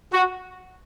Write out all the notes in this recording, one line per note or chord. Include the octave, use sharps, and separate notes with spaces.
F#4